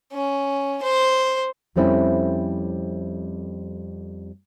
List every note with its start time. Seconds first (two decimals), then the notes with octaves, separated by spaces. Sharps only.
0.12 C#4
0.82 C5
1.76 F2 G3 A3 C4 C#4 E4